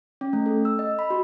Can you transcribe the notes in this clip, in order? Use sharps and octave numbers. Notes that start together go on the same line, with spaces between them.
C#4
A3
A4
E6
D#5
B5
F#4